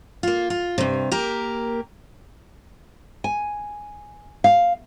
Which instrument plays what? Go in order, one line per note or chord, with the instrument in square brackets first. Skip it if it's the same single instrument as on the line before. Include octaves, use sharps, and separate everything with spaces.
[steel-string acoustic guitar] A#3 F4
F4
G2 C3
A#3 G4 A#4
[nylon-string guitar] G#5
F5